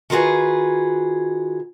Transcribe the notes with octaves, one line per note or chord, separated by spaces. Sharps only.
D#3 F4 F#4 G#4 B4